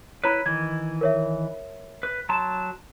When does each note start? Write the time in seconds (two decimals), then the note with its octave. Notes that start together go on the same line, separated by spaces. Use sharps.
0.24 E4 B4 C#5 A#5 B5
0.46 D#3 E3 G#6
1.01 A#4 C#5 E5
2.03 B4
2.29 F#3 A5 A#5 C6 E7